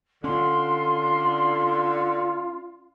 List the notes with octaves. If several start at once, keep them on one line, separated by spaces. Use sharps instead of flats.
D3 C#4 F4 C6